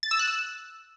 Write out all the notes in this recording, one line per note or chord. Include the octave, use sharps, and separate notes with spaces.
A6
E6
F#6
E6